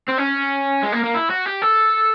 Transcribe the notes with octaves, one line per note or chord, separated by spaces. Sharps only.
C4
C#4
G#3
A#3
A#3
E4
F#4
G4
A4